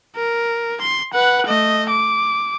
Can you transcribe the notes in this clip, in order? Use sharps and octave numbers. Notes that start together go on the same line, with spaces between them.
A#4
C6
B4 F#5
A3 D#5
D6